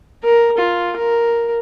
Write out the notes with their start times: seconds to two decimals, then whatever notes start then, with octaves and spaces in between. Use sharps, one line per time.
0.23 A#4
0.57 F4
0.97 A#4